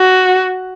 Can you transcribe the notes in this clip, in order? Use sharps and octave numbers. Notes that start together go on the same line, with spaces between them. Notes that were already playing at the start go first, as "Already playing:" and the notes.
Already playing: F#4